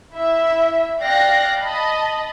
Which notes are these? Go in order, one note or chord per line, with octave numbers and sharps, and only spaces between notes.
E4 E5
D5 F5 G5 F#6 A#6
D#5 A5 B5